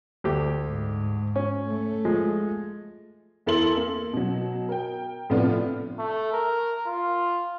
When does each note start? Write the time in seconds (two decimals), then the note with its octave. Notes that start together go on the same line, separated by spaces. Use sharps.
0.24 D2 G4
0.66 G#2
1.36 C#4
1.67 A3
2.05 F3 G#3
3.46 E2 E4 A4 A#4 C6 F#7
3.77 A#3
4.13 B2 F#3
4.69 A#4 G5
5.30 A2 C3 F3 B3 D4 F4
5.99 A3
6.33 A#4
6.87 F4